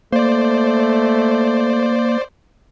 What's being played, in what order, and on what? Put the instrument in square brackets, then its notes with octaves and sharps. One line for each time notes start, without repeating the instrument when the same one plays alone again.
[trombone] A3 [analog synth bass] A#3 [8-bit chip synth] C5 D5